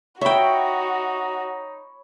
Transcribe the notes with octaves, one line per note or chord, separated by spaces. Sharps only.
D#4 F#4 C#5 E5 G5 B5